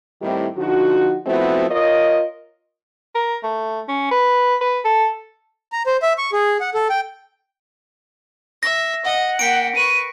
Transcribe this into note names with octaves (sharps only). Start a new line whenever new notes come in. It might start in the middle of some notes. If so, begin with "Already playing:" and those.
A2 D#3 G3 C4 E4 G4
D3 F3 D#4 F#4
F3 A3 B3 C4 E4 F#4
F4 A#4 C#5 D#5
A#4
A3
C#4
B4
B4
A4
A#5
C5
E5
C#6
G#4
F#5
A4
G5
E5 A#6
D#5 F#5
A#3 G5 B6 C#7 D7
B4 C#6 D#7